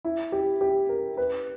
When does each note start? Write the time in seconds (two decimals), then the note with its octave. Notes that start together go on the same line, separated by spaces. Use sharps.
0.05 E4
0.32 G4
0.61 G4
0.89 A#4
1.17 B4